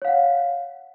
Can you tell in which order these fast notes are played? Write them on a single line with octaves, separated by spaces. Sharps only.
C#5 F5 F#5